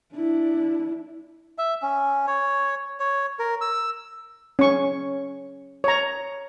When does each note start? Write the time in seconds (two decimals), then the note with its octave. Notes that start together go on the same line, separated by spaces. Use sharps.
0.15 D4 E4
1.58 E5
1.82 C#4
2.27 C#5
3.00 C#5
3.39 A#4
3.61 E6
4.59 C#4 C#6
5.84 C#5 A#5